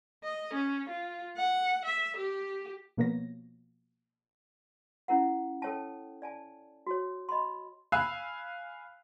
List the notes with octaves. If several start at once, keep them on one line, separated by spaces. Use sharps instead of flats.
D#5
C#4
F4
F#5
E5
G4
B2 F3 A#3 B3 C#5 A#6
C#4 E4 A#4 F#5
A4 A#4 C#5 G5 A5
D5 G#5 A5
F#4 C#5
D#5 B5 C6
F5 G#5 B5 E6 F#6